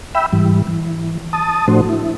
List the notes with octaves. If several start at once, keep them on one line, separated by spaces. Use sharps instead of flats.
E5 G5 B5 E6
G#2 E3 G3
E3
A5 D#6
A2 F3 A3 D4 F#4 C5
E4